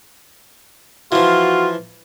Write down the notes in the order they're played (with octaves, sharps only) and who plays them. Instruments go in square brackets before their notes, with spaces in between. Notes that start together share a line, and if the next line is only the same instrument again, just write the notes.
[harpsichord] E3 F3 [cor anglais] F4 [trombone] F#4